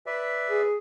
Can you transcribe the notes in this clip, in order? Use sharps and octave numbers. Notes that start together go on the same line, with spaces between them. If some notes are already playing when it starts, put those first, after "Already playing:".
B4 D5 E5
G#4